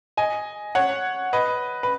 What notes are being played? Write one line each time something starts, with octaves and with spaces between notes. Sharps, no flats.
D#5 G#5
C#5 F#5
B4 D#5
B4